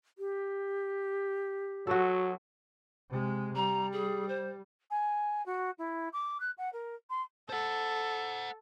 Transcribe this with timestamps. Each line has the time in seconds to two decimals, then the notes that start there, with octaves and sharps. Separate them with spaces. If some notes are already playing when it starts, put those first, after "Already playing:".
0.18 G4
1.87 F#3 F#4 A4
3.10 C3 G#3
3.55 G3 A#5
3.92 G#4
4.28 C5
4.90 G#5
5.46 F#4
5.78 E4
6.13 D6
6.40 F#6
6.58 F#5
6.73 A#4
7.10 C6
7.49 A4 C5 F#5